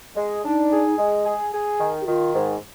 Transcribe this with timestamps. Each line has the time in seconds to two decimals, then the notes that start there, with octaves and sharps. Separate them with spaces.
0.17 G#3
0.45 D4 D#4
0.72 G#4
0.99 G#3
1.26 G#4
1.54 G#4
1.80 D#3
2.01 G4
2.07 D#3 F4
2.35 G#2